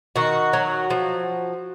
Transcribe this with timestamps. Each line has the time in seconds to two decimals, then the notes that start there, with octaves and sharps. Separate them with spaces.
0.16 D#3 F#4
0.53 F#3
0.90 F3